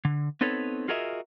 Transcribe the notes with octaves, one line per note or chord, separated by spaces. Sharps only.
D3
B3 C4 D#4 A4 B4 C#5
F4 F#4 G#4 A#4 D#5 E5